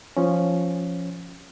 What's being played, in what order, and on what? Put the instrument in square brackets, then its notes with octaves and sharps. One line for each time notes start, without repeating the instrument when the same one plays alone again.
[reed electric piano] F3 C#4